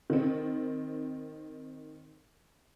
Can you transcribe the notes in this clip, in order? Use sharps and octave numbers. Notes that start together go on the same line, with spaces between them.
D#3 C4